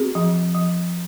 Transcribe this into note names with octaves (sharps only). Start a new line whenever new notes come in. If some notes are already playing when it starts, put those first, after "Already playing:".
Already playing: C4 F#4 G#4
F3
F3